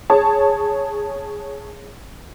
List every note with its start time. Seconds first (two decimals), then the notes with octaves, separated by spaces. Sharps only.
0.10 G#4 C#5 A5